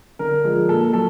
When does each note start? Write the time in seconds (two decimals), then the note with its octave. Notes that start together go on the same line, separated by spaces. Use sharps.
0.19 D3 A#4
0.44 F3 G#3
0.69 A#2 A4
0.93 F#3 A4